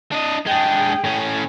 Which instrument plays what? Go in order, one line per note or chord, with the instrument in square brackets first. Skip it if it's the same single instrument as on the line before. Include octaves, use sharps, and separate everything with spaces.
[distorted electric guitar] D4 D#5
[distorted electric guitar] G#3 D4 [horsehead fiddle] G#4 G5
[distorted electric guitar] A2 C#4